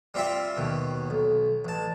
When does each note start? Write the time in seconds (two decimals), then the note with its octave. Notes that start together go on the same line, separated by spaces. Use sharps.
0.14 G3 C4 F4 E5 G5
0.57 D#2 B2
1.10 B1
1.65 A1 A5